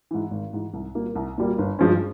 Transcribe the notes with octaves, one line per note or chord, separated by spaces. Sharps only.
G#2 E3
G#1
G#2 E3
C2
A#2 G3 A#3
C2
A#2 G3 A#3
G1
G2 F3 G#3 C#4